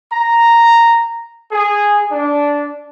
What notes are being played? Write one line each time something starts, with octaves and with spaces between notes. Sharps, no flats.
A#5
G#4
D4